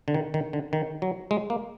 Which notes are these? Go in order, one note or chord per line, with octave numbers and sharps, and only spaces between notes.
D3
D#3
D#3
D3
D#3
F#3
G#3
A#3